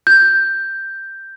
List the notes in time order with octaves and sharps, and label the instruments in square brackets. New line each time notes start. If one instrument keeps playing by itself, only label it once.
[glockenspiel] G6